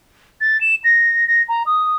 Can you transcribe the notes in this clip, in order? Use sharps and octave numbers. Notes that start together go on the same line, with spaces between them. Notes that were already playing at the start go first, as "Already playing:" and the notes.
A6
E7
A#6
A#6
A#5
D#6